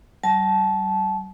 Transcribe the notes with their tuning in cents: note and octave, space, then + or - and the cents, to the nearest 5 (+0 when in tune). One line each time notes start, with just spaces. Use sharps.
G3 -45 A5 -20